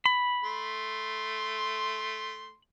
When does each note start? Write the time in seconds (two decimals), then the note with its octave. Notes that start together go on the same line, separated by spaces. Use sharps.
0.06 B5
0.44 A3 C6